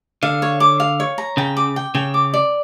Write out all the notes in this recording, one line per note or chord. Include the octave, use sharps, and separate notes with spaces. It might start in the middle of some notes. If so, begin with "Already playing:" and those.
D3 F5
C#5
D6
F5
C#5
A#5
C#3 G5
D6
G5
C#3 G5
D6
D5